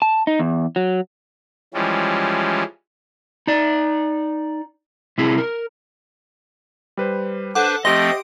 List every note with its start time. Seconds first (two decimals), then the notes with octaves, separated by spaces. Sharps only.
0.02 A5
0.27 D#4
0.40 E2
0.76 F#3
1.74 E3 F3 G3 G#3 C#4
3.47 D#4 D5
5.18 C3 C4 E4 G#4
5.38 A#4
6.97 G3 B4 C5
7.55 D4 A4 B4 C5 F#5 D6
7.85 F3 A3 C4 G4 D#5 C6 D#6 D7